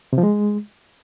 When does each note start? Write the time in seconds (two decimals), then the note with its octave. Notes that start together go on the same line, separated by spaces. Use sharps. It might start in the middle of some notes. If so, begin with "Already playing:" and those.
0.13 C3
0.18 F3
0.23 G#3